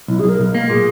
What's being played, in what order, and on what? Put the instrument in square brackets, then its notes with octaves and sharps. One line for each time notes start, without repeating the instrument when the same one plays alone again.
[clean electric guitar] B1 [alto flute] E4
[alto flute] G#4
[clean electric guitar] B1
[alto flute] A#4
[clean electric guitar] B1
A#3
[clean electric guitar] A#2 [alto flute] G#4